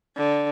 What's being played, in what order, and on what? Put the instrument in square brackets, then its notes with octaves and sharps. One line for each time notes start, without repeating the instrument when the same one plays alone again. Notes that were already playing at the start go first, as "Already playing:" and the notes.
[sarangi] D3